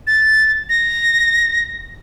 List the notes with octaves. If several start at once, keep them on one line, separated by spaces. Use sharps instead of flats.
A6
A#6